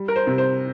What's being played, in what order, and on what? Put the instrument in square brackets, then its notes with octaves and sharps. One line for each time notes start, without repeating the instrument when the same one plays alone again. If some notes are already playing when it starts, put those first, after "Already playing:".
Already playing: [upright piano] G3
A#4
C5
C3
C5